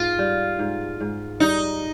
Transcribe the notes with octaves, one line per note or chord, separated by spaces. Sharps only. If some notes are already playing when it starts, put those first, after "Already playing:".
Already playing: G#2 F4
G3
G#2
G#2
G3 D#4